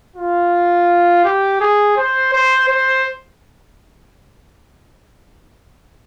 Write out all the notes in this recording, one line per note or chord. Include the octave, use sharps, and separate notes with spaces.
F4
G4
G#4
C5
C5
C5